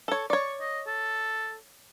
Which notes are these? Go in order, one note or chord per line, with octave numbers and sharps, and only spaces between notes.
A4 C#5
C#5 D5 C#6
D#5
A4